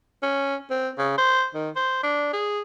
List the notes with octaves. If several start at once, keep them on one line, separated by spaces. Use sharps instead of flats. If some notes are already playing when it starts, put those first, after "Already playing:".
C#4
C4
C#3
C5
D#3
C5
D4
G#4